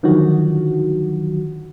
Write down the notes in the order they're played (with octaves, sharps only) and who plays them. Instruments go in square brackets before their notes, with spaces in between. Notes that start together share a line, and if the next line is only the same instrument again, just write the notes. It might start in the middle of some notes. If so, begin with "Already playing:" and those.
[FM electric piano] D3 D#3 F3 F#3 F#4